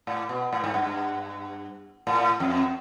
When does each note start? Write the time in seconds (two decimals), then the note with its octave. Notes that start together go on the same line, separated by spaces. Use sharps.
0.07 A2
0.29 B2
0.53 A2
0.64 G#2
0.74 G2
2.07 A2
2.40 F2